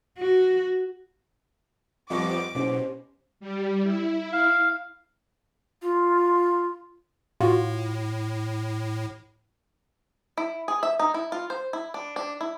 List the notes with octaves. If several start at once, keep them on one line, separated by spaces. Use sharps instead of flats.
F#4
F2 F3 G3 B3 D#5 C#6 D6 A#6
F#1 B2 C#4 G4 C5
G3
E4
F5
F4
A2 F4 F#4
E4
G#4
E5
D#4
E4
F4
C5
E4
D4
D4
E4